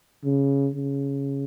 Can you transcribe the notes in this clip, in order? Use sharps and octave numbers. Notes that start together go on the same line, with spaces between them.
C#3
C#3